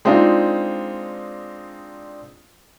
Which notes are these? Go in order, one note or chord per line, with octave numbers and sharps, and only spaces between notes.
G#3 C4 D4 D#4 F4